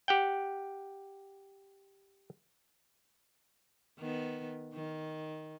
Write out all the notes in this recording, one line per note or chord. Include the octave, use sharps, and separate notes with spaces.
G4 F#5 G5
D#3 B3
D#3